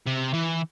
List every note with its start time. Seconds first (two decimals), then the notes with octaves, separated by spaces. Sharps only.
0.06 C3
0.34 E3